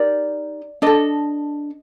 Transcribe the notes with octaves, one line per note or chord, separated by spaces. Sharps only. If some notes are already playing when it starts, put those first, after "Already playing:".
Already playing: D#4 G4 A#4 D5
D4 A4 D#5